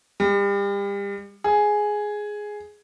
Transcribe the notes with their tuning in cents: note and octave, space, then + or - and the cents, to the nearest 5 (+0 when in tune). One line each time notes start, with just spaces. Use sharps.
G3 +35
G#4 +5